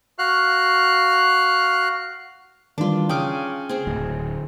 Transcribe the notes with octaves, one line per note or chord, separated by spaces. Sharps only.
F#4 F5 F6 F#6
D#3 E3 G3 D4 F4
C#3 G5 D6 D#6 F6
C4 G#4
D1